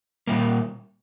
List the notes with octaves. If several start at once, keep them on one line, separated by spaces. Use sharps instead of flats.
A#2 G3 A#3